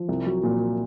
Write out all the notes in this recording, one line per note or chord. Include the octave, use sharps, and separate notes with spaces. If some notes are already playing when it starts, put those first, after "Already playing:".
Already playing: F3
C2
F#3
A#2